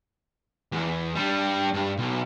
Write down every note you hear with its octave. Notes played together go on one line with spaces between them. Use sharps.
E2
G3 D4
G2
B1